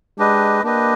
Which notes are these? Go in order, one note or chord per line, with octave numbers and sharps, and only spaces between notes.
G#3 D4 G4 B4 D#5
A#3 D4 G4 B4 D#5